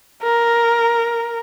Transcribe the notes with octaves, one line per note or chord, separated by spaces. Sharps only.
A#4